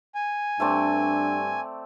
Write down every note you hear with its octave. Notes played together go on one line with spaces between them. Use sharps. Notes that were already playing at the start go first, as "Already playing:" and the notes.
G#5
G2 A3 C4 D4 D5